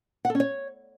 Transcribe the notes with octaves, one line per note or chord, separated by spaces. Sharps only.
F#5
A4
C#4
C#5